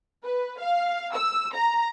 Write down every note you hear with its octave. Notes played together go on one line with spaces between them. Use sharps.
B4
F5
E6
A#5